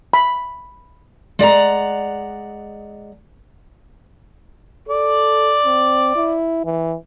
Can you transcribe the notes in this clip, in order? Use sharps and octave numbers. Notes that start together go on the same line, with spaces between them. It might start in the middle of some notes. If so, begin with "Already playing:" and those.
B5
G#3 D5 F#5 A#5
A4 D5
C4
E4
E3